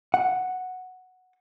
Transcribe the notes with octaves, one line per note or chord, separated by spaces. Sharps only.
F#5